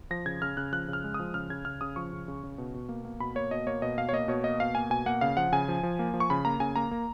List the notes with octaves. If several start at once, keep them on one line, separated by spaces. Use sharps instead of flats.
F3 A#6
C#3 G#6
C#3 F6
C#3 F#6
F3 F#6
C#3
F6
G#3
D#6
F3
C#3 F6
C#3 G#6
C#3 F6
C#3 D#6
F3 C#6
C#3
C#3
C#3
B2
B2
A#3
A#3
B2 B5
A#3 C#5
B2 D#5
A#3 C#5
B2 D#5
B2 F5
C#5
A#3 D#5
B2 C#5
A#3 D#5
B2 F5
A#3 G#5
B2 G#5
A#3 F#5
C#3 F5
F3 F#5
C#3 G#5
F3
F3
A#3
F3
C#6
C#3 B5
A#3 A#5
C#3 G#5
A#3 A#5
A#3